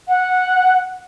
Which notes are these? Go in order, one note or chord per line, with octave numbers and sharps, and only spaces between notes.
F#5